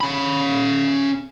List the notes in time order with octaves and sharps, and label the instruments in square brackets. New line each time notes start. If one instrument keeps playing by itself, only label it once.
[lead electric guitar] C#4 B5